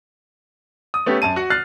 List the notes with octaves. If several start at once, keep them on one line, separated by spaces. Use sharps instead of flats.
D#6
A3 B3 C#4 G4
F#2 A5 D#7
F#4 F#5
F6 F#6 A6 C7